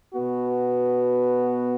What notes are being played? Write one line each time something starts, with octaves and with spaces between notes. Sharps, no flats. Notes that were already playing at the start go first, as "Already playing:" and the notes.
B2 B3 F#4